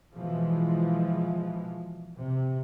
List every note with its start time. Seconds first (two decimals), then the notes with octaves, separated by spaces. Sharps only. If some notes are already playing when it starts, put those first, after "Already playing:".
0.14 B2 E3 F3 G#3
2.18 C3